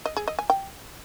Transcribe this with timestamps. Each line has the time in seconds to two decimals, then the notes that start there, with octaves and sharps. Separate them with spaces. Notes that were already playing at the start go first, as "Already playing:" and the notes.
0.06 D#5
0.17 G#4
0.28 D#5
0.39 G#5
0.50 G5